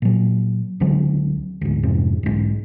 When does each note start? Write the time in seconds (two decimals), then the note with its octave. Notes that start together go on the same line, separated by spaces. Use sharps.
0.02 A#2 F#3
0.80 C#2 D3 F#3 C4
1.61 D2 G#2
1.83 F2 G#2 C3
2.23 B1 G#2